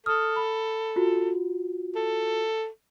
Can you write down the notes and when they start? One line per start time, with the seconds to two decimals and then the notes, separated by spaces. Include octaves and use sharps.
0.06 A4 D#6 F6
0.36 B5
0.96 F4 F#4
1.95 A4